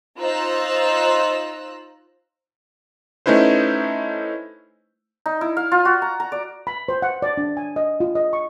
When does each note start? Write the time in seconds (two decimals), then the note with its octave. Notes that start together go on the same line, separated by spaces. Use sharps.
0.19 D#4 F4 C5 A#5 E6 F#6
3.26 A3 C#4 D#4 E4 B4 C5
5.26 D#4
5.41 E4
5.57 F5
5.72 F4
5.85 F#4
6.02 A#5
6.20 A#5
6.32 D5
6.67 B5
6.89 C5
7.02 F#5
7.22 D5
7.37 D4
7.57 G#5
7.76 D#5
8.00 F4
8.15 D#5
8.33 C#6